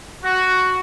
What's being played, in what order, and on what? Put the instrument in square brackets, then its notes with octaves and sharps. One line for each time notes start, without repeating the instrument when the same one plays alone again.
[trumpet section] F#4